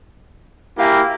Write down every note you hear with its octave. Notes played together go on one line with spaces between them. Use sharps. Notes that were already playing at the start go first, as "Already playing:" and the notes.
A#3 E4 F#4 G4 F5 G#5